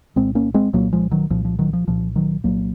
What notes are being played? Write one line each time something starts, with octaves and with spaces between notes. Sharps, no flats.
C2 A#2 G#3 C4
A#3 C#4
G#3 C4
C2 A#2 F#3 A#3
F3 G#3
D#3 F#3
C2 A#2 F3
F3
D#3 F#3
F3
C2 A#2 F3
D#3 F#3
C2 A#2 F#3 A#3